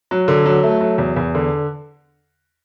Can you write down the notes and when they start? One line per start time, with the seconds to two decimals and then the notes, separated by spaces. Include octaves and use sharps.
0.11 F#3
0.28 D3
0.45 F#3
0.63 A3
0.81 F#3
0.98 E2
1.16 E2
1.35 D3